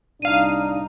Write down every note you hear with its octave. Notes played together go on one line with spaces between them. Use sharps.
C2 D4 D#4 F5 D#7